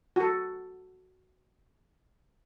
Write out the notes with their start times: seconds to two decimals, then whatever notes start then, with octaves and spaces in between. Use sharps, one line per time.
0.16 F#4 A4